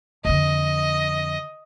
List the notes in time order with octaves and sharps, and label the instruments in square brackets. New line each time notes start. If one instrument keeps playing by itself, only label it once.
[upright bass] F2 D3 [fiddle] D#5